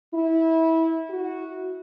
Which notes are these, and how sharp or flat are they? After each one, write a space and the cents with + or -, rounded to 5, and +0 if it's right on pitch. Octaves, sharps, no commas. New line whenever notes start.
E4 -20
F#4 -5